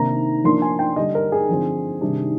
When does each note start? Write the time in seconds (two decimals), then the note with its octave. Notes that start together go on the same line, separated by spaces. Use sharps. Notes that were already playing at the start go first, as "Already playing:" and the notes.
Already playing: C3 D#3 A#3 D4 A#5
0.44 F3 A#3 D4 C6
0.62 G#5
0.79 G5
0.96 D3 G3 D4 D#5
1.15 A#4
1.32 G#4
1.49 D3 F3 C4
2.01 C3 D#3 G3 D4